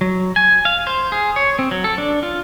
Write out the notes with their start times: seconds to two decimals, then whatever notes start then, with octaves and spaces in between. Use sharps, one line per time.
0.01 F#3
0.36 G#5
0.65 F5
0.87 C5
1.12 G#4
1.36 C#5
1.59 C4
1.71 F#3
1.84 A4
1.98 D4
2.23 F4